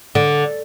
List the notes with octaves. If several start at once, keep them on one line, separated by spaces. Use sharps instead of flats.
D3